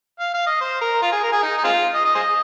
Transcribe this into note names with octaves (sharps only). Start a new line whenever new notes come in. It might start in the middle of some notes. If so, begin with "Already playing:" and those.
F5
F5
D#5
C5
A#4
F4
G#4
A#4
G#4
D#4
D#4
G#3 C4 F4
D#5
D#5
G#4 C5 D#5